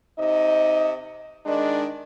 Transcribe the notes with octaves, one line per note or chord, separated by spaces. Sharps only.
C3 D#4 D#5
D#3 G#3 D4